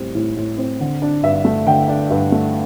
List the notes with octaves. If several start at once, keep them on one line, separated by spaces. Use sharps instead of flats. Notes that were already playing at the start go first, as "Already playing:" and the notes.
Already playing: A2 G3 C4
A2
A2
C4
D3
D4
G2 E5
A3
D3 G5
D4
G2
A3